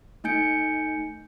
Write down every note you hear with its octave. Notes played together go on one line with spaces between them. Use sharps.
A3 D#4 G#5 G6 C#7 D7